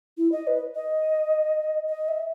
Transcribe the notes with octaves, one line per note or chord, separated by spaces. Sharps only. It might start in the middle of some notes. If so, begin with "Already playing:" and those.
E4
D#5
B4
D#5
D#5
E5